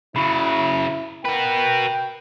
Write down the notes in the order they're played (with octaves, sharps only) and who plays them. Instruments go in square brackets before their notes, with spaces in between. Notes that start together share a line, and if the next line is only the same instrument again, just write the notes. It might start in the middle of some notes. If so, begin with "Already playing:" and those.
[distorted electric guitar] C#3 F#3 [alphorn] E4 [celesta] B5
[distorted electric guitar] F#4 B4 [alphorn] A#4 [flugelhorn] G5